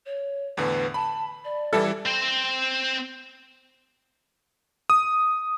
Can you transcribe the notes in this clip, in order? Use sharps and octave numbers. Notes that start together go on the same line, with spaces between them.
C#5
E2 A2 D3 B4
A5 B5
D5
E3 G3 E4 A4
C4 C5
D#6